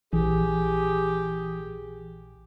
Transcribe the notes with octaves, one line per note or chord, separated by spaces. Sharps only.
A#1 E3 G4 G#4